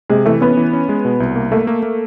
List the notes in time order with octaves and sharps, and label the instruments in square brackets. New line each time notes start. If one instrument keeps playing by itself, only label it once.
[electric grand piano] C3 [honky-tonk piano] G#3
[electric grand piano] E3 [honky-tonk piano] A3
[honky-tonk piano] B3 [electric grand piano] C#4
[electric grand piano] E3
C#4
G#3
B2
C2
A#3
[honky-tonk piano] A3 [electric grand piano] A#3
[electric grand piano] A#3
A#3